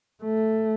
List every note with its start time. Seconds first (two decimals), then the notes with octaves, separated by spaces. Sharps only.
0.23 A3